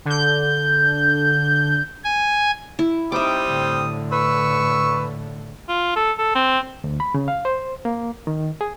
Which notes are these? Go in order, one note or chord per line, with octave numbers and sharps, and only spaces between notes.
D3 G6
G#5
E4
G3 C4 D#4 E5 D6 D#6
A2 D3
B4 C#6 E6
F4
A4
A4
C4
D2
B5
C#3
F5
C5
A#3
D#3
G#4